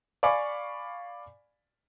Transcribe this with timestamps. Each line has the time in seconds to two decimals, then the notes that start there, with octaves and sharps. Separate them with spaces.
0.23 D5 F5 G#5 B5 C#6 D6